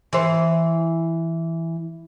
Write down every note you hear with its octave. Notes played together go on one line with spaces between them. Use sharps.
E3 C5